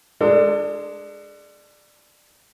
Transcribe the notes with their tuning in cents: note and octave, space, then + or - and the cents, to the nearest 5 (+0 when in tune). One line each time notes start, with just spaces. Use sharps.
G#3 +0 D4 +15 A4 +40